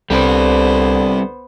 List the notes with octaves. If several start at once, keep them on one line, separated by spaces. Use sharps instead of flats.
C2 D3 G3 B3 C4 C5